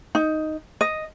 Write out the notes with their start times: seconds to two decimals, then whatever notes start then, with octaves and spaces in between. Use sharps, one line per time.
0.15 D#4
0.81 D#5